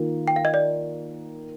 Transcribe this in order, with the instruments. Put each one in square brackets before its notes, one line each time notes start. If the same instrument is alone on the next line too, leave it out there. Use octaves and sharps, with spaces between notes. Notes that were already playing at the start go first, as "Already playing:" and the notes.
Already playing: [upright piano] D#3 A#3 F4
[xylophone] G5
F5
D#5
D5